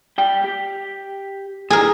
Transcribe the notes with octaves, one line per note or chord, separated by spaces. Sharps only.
G3 G5
G4
A2 D3 G#4 A#4